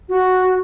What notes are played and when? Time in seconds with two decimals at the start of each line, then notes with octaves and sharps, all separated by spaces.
0.09 F#4